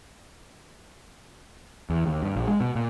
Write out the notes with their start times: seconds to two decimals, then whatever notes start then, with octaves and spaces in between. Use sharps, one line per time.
1.90 E2
2.07 D#2
2.23 G2
2.36 A#1
2.48 G#3
2.61 B2
2.75 A#2